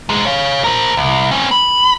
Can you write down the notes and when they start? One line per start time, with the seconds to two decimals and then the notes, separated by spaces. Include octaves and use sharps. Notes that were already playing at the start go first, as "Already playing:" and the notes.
0.09 F#2 G#3
0.25 C#5 F5
0.64 A#4 C5
0.97 C2
1.31 C4 C#4
1.51 B5